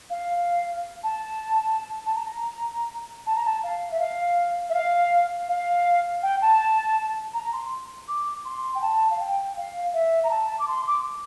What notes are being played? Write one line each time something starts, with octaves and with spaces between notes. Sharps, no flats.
F5
A5
A5
A#5
A5
A#5
A5
F5
E5
F5
E5
F5
F5
G5
A5
A#5
C6
D6
C6
G5
A5
F5
G5
F5
E5
A#5
A5
D6
C6
D6